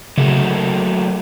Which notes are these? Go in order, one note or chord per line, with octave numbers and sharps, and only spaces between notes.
C#3 F#3 A3 A#3